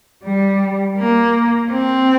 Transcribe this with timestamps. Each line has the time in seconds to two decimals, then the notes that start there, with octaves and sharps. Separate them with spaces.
0.23 G3
0.97 A#3
1.72 C4